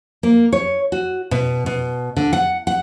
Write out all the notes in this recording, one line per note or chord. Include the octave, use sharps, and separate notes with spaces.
A#3
C#5
F#4
B2
B2
D3
F#5
F#5